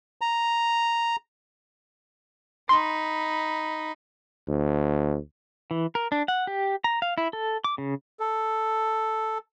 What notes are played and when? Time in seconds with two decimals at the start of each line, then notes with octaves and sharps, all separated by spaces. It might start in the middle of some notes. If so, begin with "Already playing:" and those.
0.21 A#5
2.69 D#4 B5 C6
4.48 D2
5.71 E3
5.95 A#4
6.12 D4
6.28 F#5
6.47 G4
6.84 A#5
7.02 F5
7.18 E4
7.33 A4
7.64 D6
7.78 C#3
8.20 A4